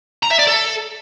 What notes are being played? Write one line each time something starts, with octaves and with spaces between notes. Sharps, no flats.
A#5
E5
D5
A4